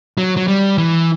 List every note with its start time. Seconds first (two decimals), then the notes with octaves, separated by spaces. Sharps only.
0.18 F#3
0.37 F#3
0.48 G3
0.78 E3